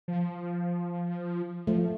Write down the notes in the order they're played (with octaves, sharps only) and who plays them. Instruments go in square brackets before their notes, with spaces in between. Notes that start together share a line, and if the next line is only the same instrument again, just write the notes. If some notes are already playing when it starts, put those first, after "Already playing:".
[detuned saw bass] F3
[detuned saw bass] F3 [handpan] A3